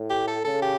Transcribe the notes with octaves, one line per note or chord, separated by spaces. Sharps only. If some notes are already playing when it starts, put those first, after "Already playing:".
Already playing: A2
G4
A4
C#3 A4
G4